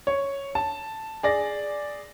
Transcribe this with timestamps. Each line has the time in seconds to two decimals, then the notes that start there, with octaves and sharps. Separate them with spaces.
0.07 C#5
0.55 A5
1.23 G#4 D5 A#6